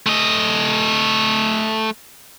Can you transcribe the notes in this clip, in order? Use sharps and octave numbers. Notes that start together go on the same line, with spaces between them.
A3 D#5